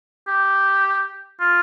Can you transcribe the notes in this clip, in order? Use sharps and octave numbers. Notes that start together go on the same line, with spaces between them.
G4
F4